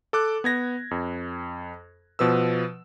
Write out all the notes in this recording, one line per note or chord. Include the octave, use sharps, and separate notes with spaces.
A4 D6 F#6
B3 G#6 A#6
F2
B2 F3 B4 E6